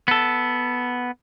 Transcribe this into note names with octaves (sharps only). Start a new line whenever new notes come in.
B3 A4